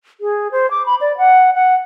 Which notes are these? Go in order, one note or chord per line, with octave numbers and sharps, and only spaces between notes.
G#4
C5
D6
B5
D5
F#5
F#5